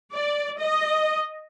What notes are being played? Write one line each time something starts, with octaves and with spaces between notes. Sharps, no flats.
D5
D#5